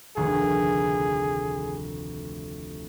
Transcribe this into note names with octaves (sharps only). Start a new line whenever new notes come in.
F1 D2 D#3 G#4